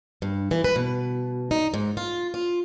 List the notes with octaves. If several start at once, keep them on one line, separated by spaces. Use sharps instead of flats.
G2
E3
B4
B2
D#4
G#2
F4
F4